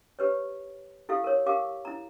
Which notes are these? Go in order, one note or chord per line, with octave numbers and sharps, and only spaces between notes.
G4 B4 C#5
E4 G4 A4 F5
A#4 C#5
G4 A#4 F5 D6
E4 A#5